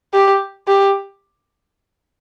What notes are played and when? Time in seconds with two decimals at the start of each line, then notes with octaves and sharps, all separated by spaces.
0.13 G4
0.68 G4